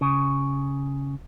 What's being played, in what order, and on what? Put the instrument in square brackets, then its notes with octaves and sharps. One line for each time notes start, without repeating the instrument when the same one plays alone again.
[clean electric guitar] C#3